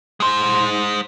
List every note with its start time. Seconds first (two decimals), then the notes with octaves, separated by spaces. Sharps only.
0.20 G#3 C5